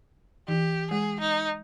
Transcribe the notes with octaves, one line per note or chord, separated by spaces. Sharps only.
E3 G4
G#3 G#4
D#4